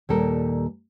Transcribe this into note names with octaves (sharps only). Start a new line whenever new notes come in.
D#2 A#2 G3 G4 A4 A#4